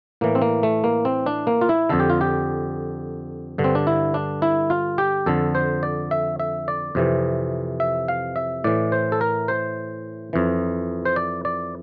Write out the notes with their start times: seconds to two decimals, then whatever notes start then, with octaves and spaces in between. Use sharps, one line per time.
0.21 A2 E3 A#3
0.35 C4
0.42 A#3
0.63 A3
0.84 A#3
1.05 C4
1.26 D4
1.47 A#3
1.61 F4
1.69 E4
1.89 F2 D3 A4
2.00 G4
2.10 F4
2.21 G4
3.58 G2 D3
3.64 C4
3.75 D4
3.87 E4
4.14 D4
4.42 E4
4.70 F4
4.98 G4
5.26 F2 D3 A4
5.55 C5
5.83 D5
6.11 E5
6.40 E5
6.68 D5
6.95 F2 C3 E3
7.80 E5
8.08 F5
8.36 E5
8.64 A2 E3 D5
8.92 C5
9.12 A4
9.21 A#4
9.48 C5
10.33 F2 E3
11.05 C5
11.16 D5
11.45 D5